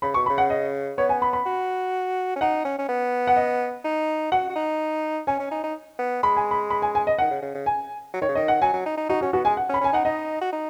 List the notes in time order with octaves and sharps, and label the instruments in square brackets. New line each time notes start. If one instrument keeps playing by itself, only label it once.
[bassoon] C#3 [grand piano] B5
[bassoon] B2 [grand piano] C#6
[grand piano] B5
[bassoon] C#3
[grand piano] F#5
D#5
[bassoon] B3 [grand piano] C#5
[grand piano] G#5
B5
B5
[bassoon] F#4
C#4
[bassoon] D#4 [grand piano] F#5
[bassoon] C#4
C#4
B3
[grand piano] F#5
D#5
[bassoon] D#4
[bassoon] F#4 [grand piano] F#5
[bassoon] F#4
D#4
[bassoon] C#4 [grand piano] G#5
[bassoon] C#4
D#4
D#4
B3
[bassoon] G#3 [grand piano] B5
[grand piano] G#5
B5
B5
G#5
G#5
D#5
[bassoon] D#3 [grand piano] F#5
[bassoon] C#3
C#3
C#3
[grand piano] G#5
[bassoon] F#3
[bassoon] D#3 [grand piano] C#5
[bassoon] C#3
[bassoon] D#3 [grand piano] D#5
[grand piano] F#5
[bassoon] F#3 [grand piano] G#5
[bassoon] F#3
D#4
D#4
[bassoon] D#4 [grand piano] F#4
[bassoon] C#4 [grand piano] F#4
[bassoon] B3 [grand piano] F#4
[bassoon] G#3 [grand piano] G#5
[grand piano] F#5
[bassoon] C#4
[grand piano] B5
[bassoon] C#4 [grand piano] G#5
[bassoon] D#4 [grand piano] F#5
[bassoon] D#4 [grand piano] D#5
[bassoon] F#4
D#4